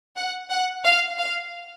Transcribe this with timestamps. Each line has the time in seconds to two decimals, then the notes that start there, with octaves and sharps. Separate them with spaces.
0.16 F#5
0.50 F#5
0.84 F5
1.18 F5